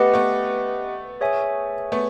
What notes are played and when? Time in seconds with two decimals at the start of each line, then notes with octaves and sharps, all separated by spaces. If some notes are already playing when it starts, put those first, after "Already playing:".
Already playing: A3 B3 G4 B4 D#5 F#5
0.14 A3 B3
1.21 G#4 C#5 E5 G#5
1.92 A3 B3